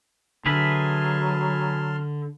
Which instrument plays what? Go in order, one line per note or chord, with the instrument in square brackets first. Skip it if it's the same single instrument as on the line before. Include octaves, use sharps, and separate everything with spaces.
[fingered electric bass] D3 [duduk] F#3 [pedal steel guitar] G#4 B4 E5 [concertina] A5 C6 F6